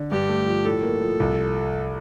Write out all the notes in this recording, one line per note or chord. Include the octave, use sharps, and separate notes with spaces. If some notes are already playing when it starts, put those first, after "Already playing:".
Already playing: D3
G2 G4
A3
F3
A2 A4
A#3
F3
C2